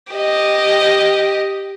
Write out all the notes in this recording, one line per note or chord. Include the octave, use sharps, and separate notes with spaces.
G4 D#5